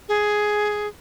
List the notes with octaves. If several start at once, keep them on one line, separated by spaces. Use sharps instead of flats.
G#4